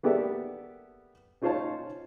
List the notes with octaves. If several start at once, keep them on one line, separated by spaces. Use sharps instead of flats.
A#3 B3 G4 A4 D5 E5
C#4 D#4 F4 C5 C#5 A5